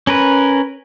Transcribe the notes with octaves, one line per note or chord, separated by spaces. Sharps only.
C#4 A#4 B4